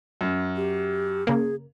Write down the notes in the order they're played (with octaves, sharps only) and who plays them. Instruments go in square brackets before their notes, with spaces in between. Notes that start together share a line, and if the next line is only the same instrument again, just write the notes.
[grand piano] F#2
[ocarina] G4
[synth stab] C#3 A#3 [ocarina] G#4